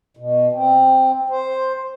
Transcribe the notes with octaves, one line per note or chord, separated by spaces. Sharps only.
B2
C4
C5